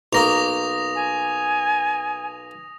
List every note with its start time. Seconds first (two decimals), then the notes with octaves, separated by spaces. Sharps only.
0.13 B1 A#3 A#5 D#6 A#6 F7
0.95 G#5